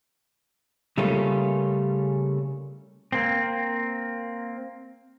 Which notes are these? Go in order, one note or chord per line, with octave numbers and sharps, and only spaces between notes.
C#3 G3 A3 A#3 C#4 F4
A#3 C4